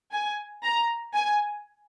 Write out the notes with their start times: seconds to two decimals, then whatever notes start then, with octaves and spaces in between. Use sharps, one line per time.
0.13 G#5
0.64 A#5
1.15 G#5